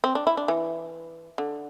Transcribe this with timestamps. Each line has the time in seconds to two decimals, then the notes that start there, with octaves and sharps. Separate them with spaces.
0.04 C4
0.15 D4
0.27 E4
0.37 D4
0.48 E3
1.38 D3